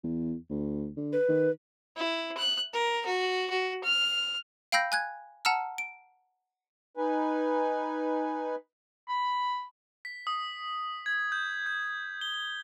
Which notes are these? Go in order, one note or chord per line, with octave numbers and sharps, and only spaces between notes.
E2
D2
D3
B4
D#3
E4
F#6
A#4
F#4
F#4
F6
F5 G5 B5 E6 G6 A#6
G#5 F#6 G#6
F#5 A5 A#5 E6 F6
D7
D#4 B4 G#5
B5
B6
D#6
G#6
G6
G6
G7
G7